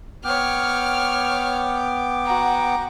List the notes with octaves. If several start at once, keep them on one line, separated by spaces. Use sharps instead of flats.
B3 C#5 G5 D6 F6
F#4 A#5